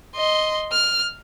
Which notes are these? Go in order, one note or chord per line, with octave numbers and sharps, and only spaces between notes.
D#5 C6
F6